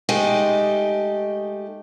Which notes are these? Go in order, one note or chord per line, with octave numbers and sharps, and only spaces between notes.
G#3 A3 D#4 G4 D#5